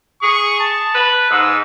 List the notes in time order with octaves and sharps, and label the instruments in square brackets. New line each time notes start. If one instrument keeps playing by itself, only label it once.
[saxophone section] G#4 [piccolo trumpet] C#6
[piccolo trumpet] A5
[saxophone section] B4
[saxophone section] G#2 [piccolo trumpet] E6